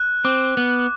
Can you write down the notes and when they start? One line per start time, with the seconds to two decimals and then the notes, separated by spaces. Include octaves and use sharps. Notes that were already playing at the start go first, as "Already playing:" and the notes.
Already playing: F#6
0.25 C4 D6
0.57 B3 F#6